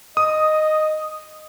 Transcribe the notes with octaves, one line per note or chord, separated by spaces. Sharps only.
D#5 D#6